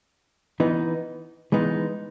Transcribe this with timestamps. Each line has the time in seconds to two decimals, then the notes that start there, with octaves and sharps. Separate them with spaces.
0.60 E3 B3 D#4
1.52 E3 G#3 B3 D#4